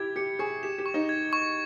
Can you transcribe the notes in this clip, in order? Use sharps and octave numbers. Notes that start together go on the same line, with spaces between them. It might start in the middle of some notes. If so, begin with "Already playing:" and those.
Already playing: E4 G4 G#6
G4 C#7
G#4 C#6
G4 E7
G4
C#6
D#4
G#6
C#6